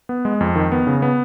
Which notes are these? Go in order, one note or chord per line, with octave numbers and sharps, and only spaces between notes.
B3
G#3
F2
D#3
B3
C#3
B3